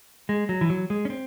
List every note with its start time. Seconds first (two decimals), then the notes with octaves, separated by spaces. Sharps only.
0.29 G#3
0.49 F#3
0.61 E3
0.70 F#3
0.90 G#3
1.05 C#4
1.10 C4